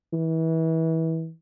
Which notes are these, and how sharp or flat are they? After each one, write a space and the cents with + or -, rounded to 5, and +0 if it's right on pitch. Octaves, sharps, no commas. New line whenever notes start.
E3 -30